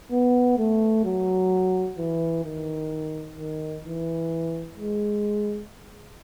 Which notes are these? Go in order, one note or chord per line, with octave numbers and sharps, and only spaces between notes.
B3
A3
F#3
E3
D#3
D#3
E3
G#3